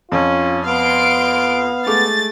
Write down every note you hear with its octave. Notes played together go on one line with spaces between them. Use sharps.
F2 C#4 F4
B3 F5 C6 D7
G#3 A3 D6 A6